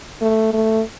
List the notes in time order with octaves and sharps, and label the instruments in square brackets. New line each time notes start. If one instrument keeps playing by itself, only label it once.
[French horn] A3
A3